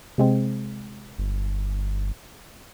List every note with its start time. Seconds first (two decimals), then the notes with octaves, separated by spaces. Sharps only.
0.18 C3 G#3 C4
1.18 G1